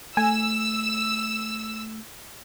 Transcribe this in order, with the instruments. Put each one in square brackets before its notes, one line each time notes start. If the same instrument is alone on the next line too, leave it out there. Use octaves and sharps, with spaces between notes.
[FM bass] A3 [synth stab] G#5 [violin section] E6